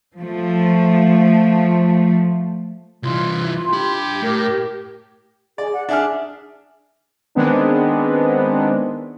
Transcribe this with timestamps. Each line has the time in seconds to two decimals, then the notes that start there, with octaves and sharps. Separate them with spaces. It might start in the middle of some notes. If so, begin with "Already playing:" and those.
0.18 F3 A3
3.03 C2 E3 F4
3.73 D4 G4 B5
4.22 A2 A#4
5.58 G#4 D5
5.73 F#5
5.89 D4 G#4 E5 F6
7.35 D#3 G#3 B3 C4 D4